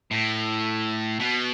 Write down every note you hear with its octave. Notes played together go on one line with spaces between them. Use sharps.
A2
B2